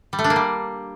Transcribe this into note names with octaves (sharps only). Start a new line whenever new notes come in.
G3
A3
D4
A#3
G3